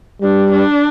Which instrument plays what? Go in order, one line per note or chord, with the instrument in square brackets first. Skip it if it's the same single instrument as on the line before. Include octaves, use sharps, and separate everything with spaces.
[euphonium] G3 [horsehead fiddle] D4
[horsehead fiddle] D4